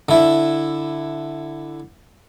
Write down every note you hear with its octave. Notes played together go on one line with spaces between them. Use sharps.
D3 E4